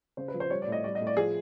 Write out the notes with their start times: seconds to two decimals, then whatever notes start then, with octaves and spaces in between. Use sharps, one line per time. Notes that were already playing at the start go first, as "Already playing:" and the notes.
0.17 C#3 C5
0.28 B4
0.34 F3
0.40 C5
0.50 G3 C#5
0.62 D5
0.67 A2 D#5
0.84 G3 D5
0.95 D#5
1.01 A2
1.07 D5
1.17 F3 G#4